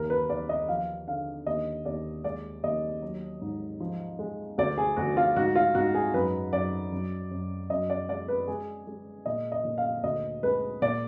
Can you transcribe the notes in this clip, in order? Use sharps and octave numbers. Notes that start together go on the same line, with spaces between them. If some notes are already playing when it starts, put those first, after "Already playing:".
Already playing: D#2 A#4
B4
D#2 D5
D#5
F3 F5
D3 F5
D#2 D#5
D#2 D5
G#3 D5
D#2 D#5
F#3
G#2
F3
G#3
D2 D5
G#4
D2 F#4
F4
G#2 F#4
F4
G#2 F#4
G#4
F#2 B4
F#2 D5
F#2
F#2
F#2 D#5
D5
G#3 D5
B4
G#3 G#4
G#3
A#2 D#5
D#5
A#2
F5
D2 D#5
G#3 B4
A#2 D5